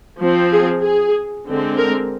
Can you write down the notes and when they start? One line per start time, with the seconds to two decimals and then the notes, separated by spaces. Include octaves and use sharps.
0.20 F3 C4
0.52 G#4
0.83 G#4
1.47 D3 G#3 C4
1.79 A#4